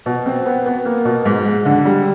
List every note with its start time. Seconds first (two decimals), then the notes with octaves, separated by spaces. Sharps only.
0.06 B2
0.26 C4
0.46 B3
0.66 B3
0.85 A#3
1.05 B2
1.25 G#2
1.45 G#3
1.65 D3
1.85 G3